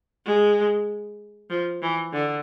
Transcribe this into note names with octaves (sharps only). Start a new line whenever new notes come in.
G#3
F3
E3
D3